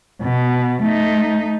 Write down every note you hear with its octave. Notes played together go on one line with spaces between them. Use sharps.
B2
A3 D#4